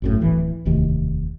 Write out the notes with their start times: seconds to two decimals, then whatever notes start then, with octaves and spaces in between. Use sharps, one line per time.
0.02 G#1 F#2 A2
0.21 D1 E3
0.65 E1 D2 C3 D#3